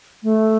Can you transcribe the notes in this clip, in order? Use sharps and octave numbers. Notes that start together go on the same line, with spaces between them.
A3